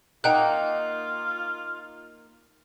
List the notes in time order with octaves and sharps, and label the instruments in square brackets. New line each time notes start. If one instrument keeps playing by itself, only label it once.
[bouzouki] A#3 D#4 [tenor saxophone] F4 [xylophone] F#5 G5 F#6